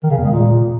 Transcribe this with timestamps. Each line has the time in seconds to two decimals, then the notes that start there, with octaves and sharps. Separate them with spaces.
0.03 D#3
0.10 C#3
0.18 E2
0.25 G#3
0.32 A#2